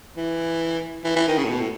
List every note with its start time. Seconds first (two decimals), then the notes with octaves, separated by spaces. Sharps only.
0.17 E3
1.05 E3
1.16 E3
1.28 D#3
1.38 C#3
1.44 A2
1.49 B2
1.60 A2